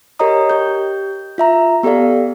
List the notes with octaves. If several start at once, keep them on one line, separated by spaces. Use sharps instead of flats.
G4 A#4 C#5 D#5 A#5 D#6
G4 G6
F4 E5 A#5
B3 G4 A4 D5 F5